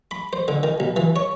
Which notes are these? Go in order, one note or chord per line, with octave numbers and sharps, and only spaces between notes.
B5
C5
D3
D#3
B1
E3
C#5